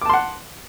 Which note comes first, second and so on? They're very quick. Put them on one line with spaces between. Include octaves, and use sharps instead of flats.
D6 A5 C6 F#5